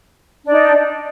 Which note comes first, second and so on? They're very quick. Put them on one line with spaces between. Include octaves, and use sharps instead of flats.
D4 D5 D#4